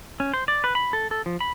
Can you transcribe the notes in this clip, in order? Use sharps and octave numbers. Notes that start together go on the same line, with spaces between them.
C#4
C5
D5
B4
B5
A4
A4
F3
B5